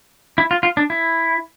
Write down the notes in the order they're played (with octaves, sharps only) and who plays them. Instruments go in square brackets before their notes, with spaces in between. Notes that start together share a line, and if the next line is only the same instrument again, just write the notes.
[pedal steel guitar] E4
F4
F4
D4
E4